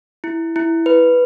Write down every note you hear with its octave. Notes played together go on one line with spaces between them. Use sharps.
E4
E4
B4